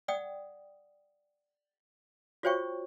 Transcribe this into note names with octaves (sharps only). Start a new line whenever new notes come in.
D5 F#5 G5 D#6
F4 F#4 C5 C#5 G5 C#6